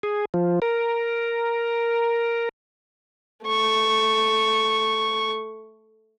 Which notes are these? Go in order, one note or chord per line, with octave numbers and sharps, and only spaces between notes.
G#4
F3
A#4
A3 C#6